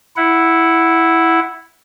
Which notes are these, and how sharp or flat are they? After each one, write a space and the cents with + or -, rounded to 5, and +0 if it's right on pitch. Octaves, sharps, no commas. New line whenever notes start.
E4 +0 F#5 +0